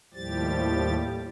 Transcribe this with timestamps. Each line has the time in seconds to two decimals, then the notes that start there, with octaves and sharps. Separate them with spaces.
0.14 D#2 A2 F3 G3 G4 A6